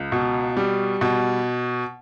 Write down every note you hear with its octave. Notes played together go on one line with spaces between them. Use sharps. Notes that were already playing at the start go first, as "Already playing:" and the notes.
Already playing: C#2
B2
G3
B2